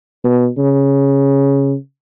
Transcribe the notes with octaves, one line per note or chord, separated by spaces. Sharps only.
B2
C#3